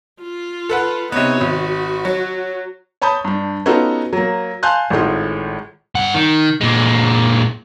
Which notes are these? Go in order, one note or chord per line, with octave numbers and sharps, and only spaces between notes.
F4
A4 B4 F#5
C3 B3 D#4 C#5
G#1 F#4
F#3
C#5 A5 B5 D#6 G6
G2 D4
B3 C#4 D#4 F4 F#4 A4
F#3 A#3
F5 G#5 A5 C6 F#6 G6
G#1 A2 G#3 F4
G2 F#5
D#3
A#2 G#3